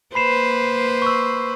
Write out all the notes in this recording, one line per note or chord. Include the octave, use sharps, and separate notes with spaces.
A#3 B4 C5 B5 C7 E7
C#6 E6